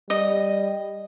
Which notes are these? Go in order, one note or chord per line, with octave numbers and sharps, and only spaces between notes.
G3 D#5